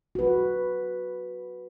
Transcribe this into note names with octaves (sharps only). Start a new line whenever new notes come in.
F#4 B4